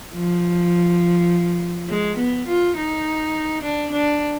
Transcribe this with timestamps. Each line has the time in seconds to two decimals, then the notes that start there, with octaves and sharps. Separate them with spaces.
0.15 F3
1.89 G#3
2.17 B3
2.47 F4
2.76 D#4
3.63 D4
3.92 D4